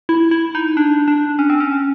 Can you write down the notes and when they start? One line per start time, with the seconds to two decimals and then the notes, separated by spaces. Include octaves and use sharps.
0.09 E4
0.31 E4
0.55 D#4
0.77 D4
1.08 D4
1.39 C#4
1.50 C4
1.60 C#4